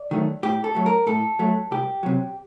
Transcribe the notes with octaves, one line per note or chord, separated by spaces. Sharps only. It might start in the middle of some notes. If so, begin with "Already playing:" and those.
Already playing: D5
D#3 F#3 A3
A2 G4
A4
F#3 A3
A#4
A2 A4
F#3 A3
C2 G4
C3 F#3